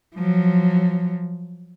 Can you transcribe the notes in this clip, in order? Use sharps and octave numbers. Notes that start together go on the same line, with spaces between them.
F3 F#3